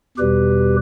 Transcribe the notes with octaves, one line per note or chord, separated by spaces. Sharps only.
E2 B2 G3 G4 B4